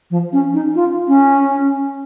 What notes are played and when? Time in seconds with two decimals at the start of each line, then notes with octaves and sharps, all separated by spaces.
0.11 F3
0.33 C#4
0.54 D#4
0.75 F4
1.08 C#4